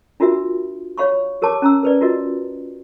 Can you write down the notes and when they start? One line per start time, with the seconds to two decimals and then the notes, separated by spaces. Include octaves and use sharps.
0.20 D4 F4 F#4 A#4 E5
0.98 C#5 F5 B5 C#6
1.42 G4 A#4 C#5 A5 D6
1.62 C#4 A#5 E6
1.83 A#4 B4 D5
2.01 F4 F#4 A#4 D#5